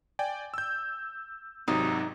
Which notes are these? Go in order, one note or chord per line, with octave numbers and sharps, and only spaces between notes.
D5 G5 G#5
E6 G6
G#1 C3 F#3 D#4